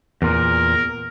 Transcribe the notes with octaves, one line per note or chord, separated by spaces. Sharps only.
E2 A#2 A#4